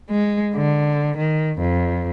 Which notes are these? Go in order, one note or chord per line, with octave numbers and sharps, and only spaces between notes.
G#3
D3
D#3
F2